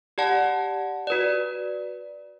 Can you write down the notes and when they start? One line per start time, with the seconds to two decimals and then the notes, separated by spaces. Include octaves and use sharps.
0.18 G4 D5 F#5 A5
1.07 F#4 B4 D5